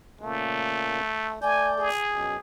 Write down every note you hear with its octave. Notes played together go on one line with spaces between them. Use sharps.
A#2 C#3 A3 A#3
A3 D5 G#5 G6
G#4
F#2 B2